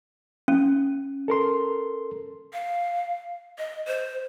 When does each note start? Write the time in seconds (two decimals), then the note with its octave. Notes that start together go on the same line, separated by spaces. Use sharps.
0.48 C#4
1.28 A4 A#4 C6
2.53 F5
3.58 D#5
3.87 C5